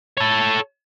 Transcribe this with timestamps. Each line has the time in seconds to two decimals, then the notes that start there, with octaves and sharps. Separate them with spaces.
0.18 A4 C#5